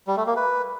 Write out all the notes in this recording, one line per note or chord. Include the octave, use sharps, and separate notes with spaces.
G3
A3
A#3
B4